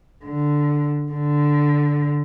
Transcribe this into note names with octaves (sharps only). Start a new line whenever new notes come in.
D3
D3